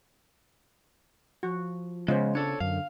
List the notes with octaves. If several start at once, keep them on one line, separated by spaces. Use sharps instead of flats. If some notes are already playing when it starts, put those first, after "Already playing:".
F3 F#4
C#3 G#3 B3 F4 C5
D4 A4 C#5
F#2 D3 F5